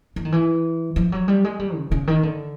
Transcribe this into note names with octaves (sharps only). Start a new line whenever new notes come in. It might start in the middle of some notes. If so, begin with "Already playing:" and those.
E3
D#3
E3
F3
F#3
G3
G#3
G3
C#3
C#3
D#3
D3